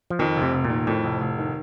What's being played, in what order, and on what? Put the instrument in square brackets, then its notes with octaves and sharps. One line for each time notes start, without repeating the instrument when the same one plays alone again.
[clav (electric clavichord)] F3
[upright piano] F2 [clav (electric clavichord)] D#3
[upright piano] F1
[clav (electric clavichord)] C3
[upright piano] F1
[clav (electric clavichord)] A#2
[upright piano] D#3
[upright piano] F2 [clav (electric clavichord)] A2
[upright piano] F1
F1
D#3